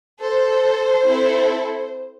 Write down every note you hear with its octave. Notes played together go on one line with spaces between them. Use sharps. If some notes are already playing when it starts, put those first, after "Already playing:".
A4 C5
C4 E4 A4